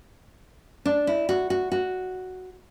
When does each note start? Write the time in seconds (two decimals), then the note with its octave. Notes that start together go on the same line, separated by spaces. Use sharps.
0.85 D4
1.07 E4
1.29 F#4
1.50 F#4
1.72 F#4